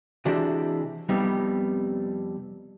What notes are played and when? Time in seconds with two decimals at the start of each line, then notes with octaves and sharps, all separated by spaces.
0.25 C3 E3 G#3 D4 F#4 G4
1.09 F2 C3 G3 B3 D#4